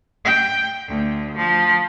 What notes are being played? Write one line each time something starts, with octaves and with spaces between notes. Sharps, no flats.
G5
D2
F3